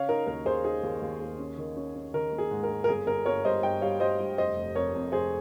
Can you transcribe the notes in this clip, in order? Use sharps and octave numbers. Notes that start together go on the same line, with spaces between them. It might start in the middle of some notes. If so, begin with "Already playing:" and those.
Already playing: C#3 C#5 F5
D#4 A#4
D#2 A#4
D#2 G#4 C5
D#4 G#4
D#2
D#2
D#2
C#4
D#3
C#4
C#4
D#3 A#4
A#3
G#4
G#2
A#4
A#3
A#4
G1 G#4
G1 A#4
G1 A#4 C#5
G3 C5 D#5
G2 D#5 G5
G3 C#5 F5
G3 C5 D#5
G2
F1 C5 D#5
F1
F2 A#4 C#5
F2
F1 G#4 C5